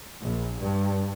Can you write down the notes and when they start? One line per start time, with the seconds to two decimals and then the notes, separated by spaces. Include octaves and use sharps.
0.21 A#1
0.60 G2